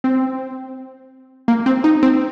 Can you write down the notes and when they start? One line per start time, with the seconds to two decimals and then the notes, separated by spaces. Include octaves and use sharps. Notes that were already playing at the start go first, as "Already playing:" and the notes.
0.04 C4
1.48 A#3
1.66 C4
1.84 D#4
2.03 C4